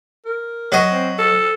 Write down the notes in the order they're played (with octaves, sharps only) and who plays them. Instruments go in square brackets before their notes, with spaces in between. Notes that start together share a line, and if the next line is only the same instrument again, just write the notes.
[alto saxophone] A#4
[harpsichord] F#3 D#5
[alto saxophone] C4
A4